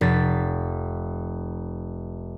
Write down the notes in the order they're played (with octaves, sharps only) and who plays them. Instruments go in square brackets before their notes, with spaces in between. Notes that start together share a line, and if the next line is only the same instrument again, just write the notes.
[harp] F1 A6 B6